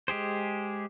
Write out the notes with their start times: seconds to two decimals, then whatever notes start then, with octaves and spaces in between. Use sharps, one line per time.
0.08 G#3 G4 G#4 C5